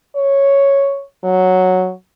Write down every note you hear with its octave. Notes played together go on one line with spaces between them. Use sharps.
C#5
F#3